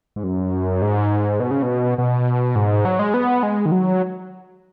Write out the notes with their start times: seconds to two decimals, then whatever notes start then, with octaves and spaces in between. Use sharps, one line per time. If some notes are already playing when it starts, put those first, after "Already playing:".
0.16 G#2
0.24 F#2
0.82 G#2
1.40 B2
1.51 C#3
1.63 B2
1.98 B2
2.56 G#2
2.85 F#3
2.99 G#3
3.14 B3
3.43 G#3
3.66 D#3
3.72 F#3